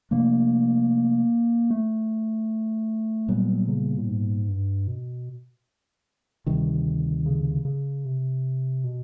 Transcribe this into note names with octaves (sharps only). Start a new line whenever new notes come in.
C3 F3 A3 A#3 D4
A3
A#2 F#3 G3 B3
C#3
A2
G#2
G2
B2
D2 C3 D#3 G3
C#3
C#3
C3
B2